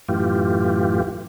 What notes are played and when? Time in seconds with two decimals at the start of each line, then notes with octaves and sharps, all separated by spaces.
0.09 F#2 A2 E3 F4 G4